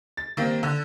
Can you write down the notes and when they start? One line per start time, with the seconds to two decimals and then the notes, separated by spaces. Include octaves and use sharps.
0.17 A6
0.37 D#3 G3 A#3 C4
0.63 D3